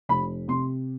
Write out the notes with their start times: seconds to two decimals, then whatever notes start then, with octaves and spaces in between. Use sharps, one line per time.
0.09 F1 B5
0.48 C3 C6